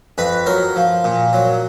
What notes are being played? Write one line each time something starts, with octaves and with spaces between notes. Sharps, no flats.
F2 B4
F#3 A#4
F3
A#2
F#3